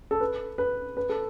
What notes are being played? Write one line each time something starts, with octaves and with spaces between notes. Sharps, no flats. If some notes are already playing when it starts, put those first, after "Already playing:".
A4
B4
B4
B4
A4